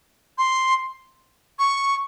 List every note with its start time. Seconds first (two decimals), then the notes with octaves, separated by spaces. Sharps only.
0.38 C6
1.59 C#6